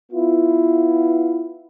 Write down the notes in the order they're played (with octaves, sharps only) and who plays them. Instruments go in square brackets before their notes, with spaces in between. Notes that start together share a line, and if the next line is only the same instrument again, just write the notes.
[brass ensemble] B3 E4 F4